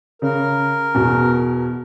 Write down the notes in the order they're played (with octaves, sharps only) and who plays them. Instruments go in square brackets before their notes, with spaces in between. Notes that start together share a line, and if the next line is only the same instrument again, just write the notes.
[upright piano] C#3 [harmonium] A#4
[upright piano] E2 B2